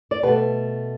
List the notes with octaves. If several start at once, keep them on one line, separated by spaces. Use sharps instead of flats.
D5
B2 A3 G4 B4